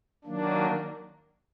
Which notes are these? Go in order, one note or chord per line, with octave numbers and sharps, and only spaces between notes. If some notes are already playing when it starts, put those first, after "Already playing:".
D#3 F#3 A#3 D4